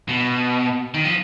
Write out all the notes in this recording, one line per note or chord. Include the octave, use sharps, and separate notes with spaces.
B2
D#3
F3